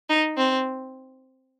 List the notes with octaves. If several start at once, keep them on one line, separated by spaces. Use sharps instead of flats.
D#4
C4